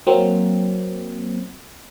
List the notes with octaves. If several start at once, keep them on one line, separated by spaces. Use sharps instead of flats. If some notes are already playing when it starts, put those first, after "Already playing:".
F#3 A#3 C4